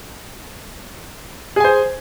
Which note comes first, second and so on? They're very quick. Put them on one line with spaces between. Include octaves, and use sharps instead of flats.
G#4 G#5 C5